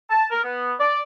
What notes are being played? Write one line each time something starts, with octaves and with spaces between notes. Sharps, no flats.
A5
A#4
B3
D5